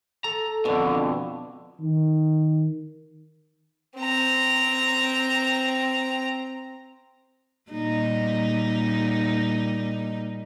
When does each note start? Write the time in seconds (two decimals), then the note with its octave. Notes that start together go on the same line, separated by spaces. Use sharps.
0.24 A4 A#5
0.65 F2 B2 D3 D4
1.80 D#3
3.98 C4 A#5
7.71 A#2 G3 D#4